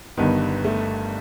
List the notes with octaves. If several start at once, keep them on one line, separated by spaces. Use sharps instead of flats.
G1 G2 D#3 B3
A3